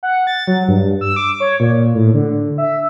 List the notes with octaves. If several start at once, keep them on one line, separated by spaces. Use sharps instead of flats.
F#5
A6
F#3
G2
E6
D6
C#5
A#2
A2
D3
E5